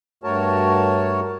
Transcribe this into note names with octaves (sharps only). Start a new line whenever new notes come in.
G2 A3 F#4 A#4 C#5 A5